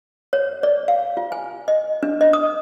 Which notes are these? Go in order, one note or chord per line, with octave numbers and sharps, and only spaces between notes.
C#5
D5
F5
F4
G#5
D#5
D4
D#5
D#6